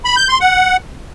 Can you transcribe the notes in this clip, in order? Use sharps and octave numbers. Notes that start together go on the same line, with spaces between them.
B5
G6
C6
F#5